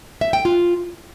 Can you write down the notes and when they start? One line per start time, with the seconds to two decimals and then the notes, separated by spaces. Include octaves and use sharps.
0.21 E5
0.33 G5
0.45 F4